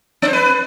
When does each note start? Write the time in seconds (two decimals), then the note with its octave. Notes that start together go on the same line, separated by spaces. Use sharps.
0.22 C4
0.28 C5
0.33 B4